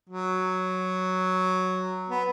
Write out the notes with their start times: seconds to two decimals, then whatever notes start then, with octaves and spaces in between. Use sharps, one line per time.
0.09 F#3
2.09 B3